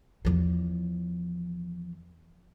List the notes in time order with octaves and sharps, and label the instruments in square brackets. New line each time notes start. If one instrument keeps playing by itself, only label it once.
[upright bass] E2 F3